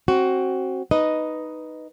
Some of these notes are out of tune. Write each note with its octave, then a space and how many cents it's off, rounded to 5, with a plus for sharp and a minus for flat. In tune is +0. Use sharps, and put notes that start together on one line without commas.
C4 +25 F#4 +15
D#4 +0 B4 +0 D#5 +0